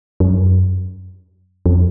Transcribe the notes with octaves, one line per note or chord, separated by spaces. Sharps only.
F#2
F2